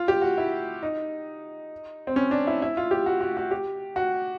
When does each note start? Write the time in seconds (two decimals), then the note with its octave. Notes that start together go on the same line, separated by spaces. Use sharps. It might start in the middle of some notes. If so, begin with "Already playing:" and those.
Already playing: F4
0.08 G4
0.22 F#4
0.38 E4
0.83 D#4
2.07 C4
2.16 C#4
2.31 D4
2.47 E4
2.62 E4
2.77 F4
2.91 G4
3.06 F#4
3.21 F#4
3.37 F#4
3.51 G4
3.96 F#4